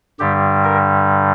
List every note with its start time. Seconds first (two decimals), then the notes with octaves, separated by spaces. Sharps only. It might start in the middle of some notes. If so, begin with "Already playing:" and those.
0.19 G2 D3 G3 G4
0.64 A#4